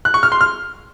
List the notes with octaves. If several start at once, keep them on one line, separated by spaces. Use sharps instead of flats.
F#6
C#6
F6
C6
F6